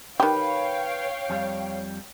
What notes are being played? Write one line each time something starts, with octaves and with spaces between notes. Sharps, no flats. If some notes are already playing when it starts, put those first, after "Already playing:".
D#3 G4 B4 C#5 F5 G5
F2 G3